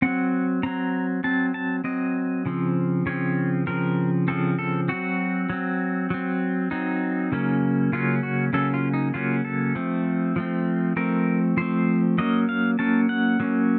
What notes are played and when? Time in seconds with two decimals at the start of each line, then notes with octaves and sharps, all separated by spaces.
0.02 F#3 C4 F#5
0.63 F#3 C4 A#5
1.24 F#3 C4 A5
1.54 A5
1.84 F#3 C4 D#5
2.46 C#3 F3 C4
3.06 C#3 F3 C4 C#5
3.67 C#3 F3 C4 A#4
4.28 C#3 F3 C4 A4
4.59 A4
4.88 F#3 C4 F#4
5.50 F#3 C4
6.10 F#3 C4
6.71 F#3 C4 D#4
7.32 C#3 F#3 A#3 C#4
7.93 C#3 F#3 A#3 C#4 F4
8.23 F#4
8.53 C#3 F#3 A#3 C#4 A4
8.74 F4
8.94 D#4
9.14 C#3 F#3 A#3 C#4 F4
9.45 A4
9.75 F3 A3 C4
10.36 F3 A3 C4
10.96 F3 A3 C4 A#4
11.57 F3 A3 C4 C5
12.18 F#3 A#3 C#4 D#5
12.49 F5
12.79 F#3 A#3 C#4 A5
13.09 F#5
13.40 F#3 A#3 C#4